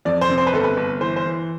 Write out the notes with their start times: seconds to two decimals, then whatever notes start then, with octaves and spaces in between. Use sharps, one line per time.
0.05 F2 D5
0.21 C5
0.30 C3
0.38 C5
0.47 B4
0.53 G1 A4
0.64 B4
0.77 G1
1.00 E3 C5
1.16 C5
1.25 E3